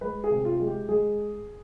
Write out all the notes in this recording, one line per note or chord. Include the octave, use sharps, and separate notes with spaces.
G#3 B4
G#4
C3
F4
G#3
G4
G#3 G#4